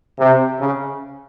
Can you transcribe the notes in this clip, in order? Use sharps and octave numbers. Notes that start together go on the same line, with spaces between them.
C3
C#3